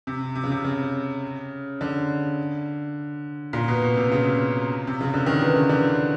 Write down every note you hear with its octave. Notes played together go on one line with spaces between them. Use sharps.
C3
C3
C#3
C3
C#3
D3
A#2
B2
B2
C3
C#3
C3
C#3
D3
D#3
E3
C#3
D3